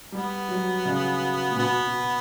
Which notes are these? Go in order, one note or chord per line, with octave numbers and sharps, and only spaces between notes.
G3 B3
F#3
C#3
A#2
B2 B3
B2